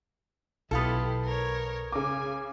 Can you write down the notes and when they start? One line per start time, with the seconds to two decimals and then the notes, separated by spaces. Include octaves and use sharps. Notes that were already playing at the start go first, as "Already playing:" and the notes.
0.71 B1 B3 E4 F4 G4 A4
1.24 A#4 C#5
1.92 C#3 G#5 D6